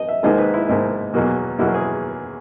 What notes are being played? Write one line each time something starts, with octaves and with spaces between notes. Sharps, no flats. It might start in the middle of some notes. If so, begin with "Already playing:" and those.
Already playing: D#5
E5
G#1 G#2 D#3 A#3 D#5
B4
E4
G#1 G#2 D#3 A#3 D#4
E2 B2 F#3 A#3
E2 B2 F#3 A#3 E4
G#4